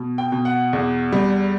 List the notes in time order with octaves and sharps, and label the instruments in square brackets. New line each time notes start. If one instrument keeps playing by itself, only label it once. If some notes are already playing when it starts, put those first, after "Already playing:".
Already playing: [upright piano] B2
G5
B2
F#5
E2
G3